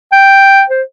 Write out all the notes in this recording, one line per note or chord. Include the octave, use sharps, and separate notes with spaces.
G5
C5